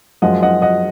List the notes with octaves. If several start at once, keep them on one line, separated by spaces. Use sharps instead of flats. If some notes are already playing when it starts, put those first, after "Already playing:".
F#2 F3 G#3 D#5 F#5
D#5 F#5
D#5 F#5